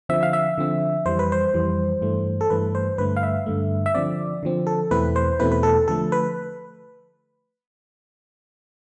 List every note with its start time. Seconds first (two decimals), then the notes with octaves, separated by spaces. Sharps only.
0.09 D3 F3 C4 E5
0.23 F5
0.33 E5
0.58 D3 F3 C4
1.06 F2 E3 G3 C5
1.19 B4
1.32 C5
1.54 F2 E3 G3
2.01 G2 E3 A3
2.41 A4
2.50 G2 E3 A3 B4
2.75 C5
2.98 G2 D3 A3 B4
3.17 F5
3.23 E5
3.46 G2 D3 A3
3.86 E5
3.95 D3 F3 C4 D5
4.43 D3 F3 C4
4.67 A4
4.91 E2 B2 A3 C4 E4 B4
5.16 C5
5.39 E2 B2 A3 C4 E4 B4
5.52 B4
5.63 A4
5.88 D3 F3 A3 A4
6.12 B4